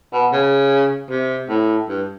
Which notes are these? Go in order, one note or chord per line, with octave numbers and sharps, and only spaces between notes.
B2
C#3
C3
A2
G2